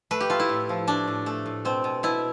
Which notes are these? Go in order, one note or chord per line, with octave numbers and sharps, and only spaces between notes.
A3 B4
G4
A3 F4
E4
A2
F3
A3 D4
A2
A3
A2
B2 C4
B2
B2 E4